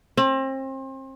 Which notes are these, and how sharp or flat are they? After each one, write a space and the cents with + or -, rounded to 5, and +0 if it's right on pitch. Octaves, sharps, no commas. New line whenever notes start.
C4 +35